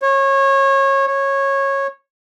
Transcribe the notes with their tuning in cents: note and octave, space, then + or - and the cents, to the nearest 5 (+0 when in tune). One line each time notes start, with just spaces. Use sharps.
C#5 -25
C#5 -15